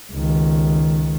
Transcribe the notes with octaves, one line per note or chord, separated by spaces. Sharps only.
C#2 D#3